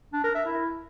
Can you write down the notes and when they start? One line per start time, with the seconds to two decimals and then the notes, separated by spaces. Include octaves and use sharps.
0.13 D4
0.24 A#4
0.35 E5
0.46 E4